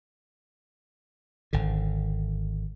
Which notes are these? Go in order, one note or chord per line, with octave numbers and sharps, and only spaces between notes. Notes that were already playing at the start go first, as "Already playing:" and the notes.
G#1 D3